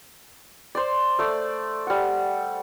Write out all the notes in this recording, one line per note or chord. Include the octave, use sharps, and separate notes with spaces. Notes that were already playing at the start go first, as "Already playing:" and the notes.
C5 D5
A3 D5
G3 F#5